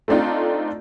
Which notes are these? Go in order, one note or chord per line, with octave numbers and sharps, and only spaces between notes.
A3 C4 D4 D#4 F4